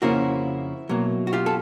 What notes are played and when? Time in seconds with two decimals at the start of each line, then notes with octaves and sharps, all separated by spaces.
0.02 F2 C#3 F3 A#3 C#4 E4 F#4
0.89 B2 F#3 A#3
1.27 F#4
1.33 F4 G4
1.46 A4